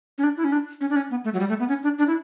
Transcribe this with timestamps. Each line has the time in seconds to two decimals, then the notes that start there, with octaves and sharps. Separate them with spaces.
0.18 C#4
0.23 D4
0.37 E4
0.44 C#4
0.52 D4
0.81 C#4
0.90 D4
0.96 C#4
1.10 B3
1.24 A3
1.34 F#3
1.40 G3
1.49 A3
1.59 B3
1.68 C#4
1.83 D4
1.98 D4
2.07 E4